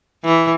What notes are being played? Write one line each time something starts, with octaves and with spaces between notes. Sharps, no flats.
E3